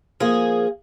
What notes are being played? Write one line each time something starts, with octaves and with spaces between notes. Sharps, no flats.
F3 A#3 G#4